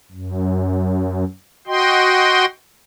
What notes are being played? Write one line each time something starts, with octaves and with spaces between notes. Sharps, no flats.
F#2
F#4 D#5 G5 C6